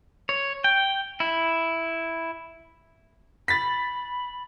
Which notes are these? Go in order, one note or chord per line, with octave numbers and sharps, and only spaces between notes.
C#5
G5
E4
B5 A6 B6